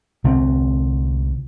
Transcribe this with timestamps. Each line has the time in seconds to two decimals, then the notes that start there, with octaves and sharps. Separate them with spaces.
0.24 C2 D3 C4